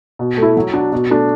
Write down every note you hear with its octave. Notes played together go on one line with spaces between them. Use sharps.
B2
A3 E4
F#3
D4 F#4
B2
A3 D4